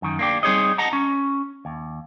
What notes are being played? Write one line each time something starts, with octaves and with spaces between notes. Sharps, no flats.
F#2 D#3
A#3 D4 G4
G3 C4 D#4 G#4 C#5 D#5
D#5 F#5 A5 A#5
C#4
D#2